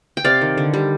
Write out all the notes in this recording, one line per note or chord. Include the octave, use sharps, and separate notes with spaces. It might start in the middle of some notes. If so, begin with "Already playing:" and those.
G5
C3 D5 F5
D#3
D3
G3